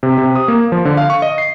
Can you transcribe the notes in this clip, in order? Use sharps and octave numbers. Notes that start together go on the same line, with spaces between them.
C3
C3
D#6
A#3
F3
D3
F5
C#6
D#5
C7